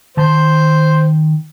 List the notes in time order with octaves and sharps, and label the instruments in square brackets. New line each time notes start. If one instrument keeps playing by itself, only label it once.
[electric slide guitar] D#3 A5 [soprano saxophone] C5